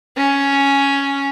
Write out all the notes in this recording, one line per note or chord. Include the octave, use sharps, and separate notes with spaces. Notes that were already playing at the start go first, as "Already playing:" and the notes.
C#4